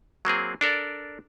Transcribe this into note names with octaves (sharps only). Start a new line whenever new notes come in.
F#3 A#3 C4 G#4
D4 A4 A#4 D5